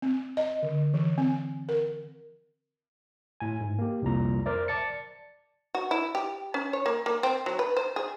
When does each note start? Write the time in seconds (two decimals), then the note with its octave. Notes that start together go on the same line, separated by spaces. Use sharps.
0.02 C4
0.37 D#5
0.62 D3
0.94 E3
1.18 C4
1.69 A#4
3.40 A2 G#5
3.61 G#2
3.79 A#3 G4
4.02 C2 F2 A#2 A#3 A#5
4.46 A#4 C5 D5 E5
4.68 D5 A5 A6 C#7
5.75 F#4
5.91 E4
6.15 G4
6.54 C#4
6.73 C#5
6.86 A#3
7.06 A#3
7.23 C4
7.46 F#3
7.59 B4
7.77 C5
7.96 G#4